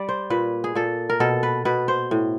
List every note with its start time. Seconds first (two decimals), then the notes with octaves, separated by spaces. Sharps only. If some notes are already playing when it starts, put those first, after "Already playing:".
Already playing: G3 D5
0.09 C5
0.30 A#2 B4
0.64 G#4
0.75 A#2 A4
1.10 A#4
1.20 B2 A4
1.43 B4
1.65 B2 B4
1.88 C5
2.11 A2